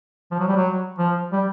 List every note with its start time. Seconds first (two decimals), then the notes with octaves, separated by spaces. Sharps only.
0.31 F3
0.40 F#3
0.48 G3
0.56 F#3
0.99 F3
1.32 G3